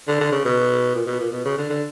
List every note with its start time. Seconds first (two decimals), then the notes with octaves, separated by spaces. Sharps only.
0.08 D3
0.20 D3
0.32 C#3
0.45 B2
0.95 A#2
1.07 B2
1.20 A#2
1.32 B2
1.45 C#3
1.58 D3
1.69 D3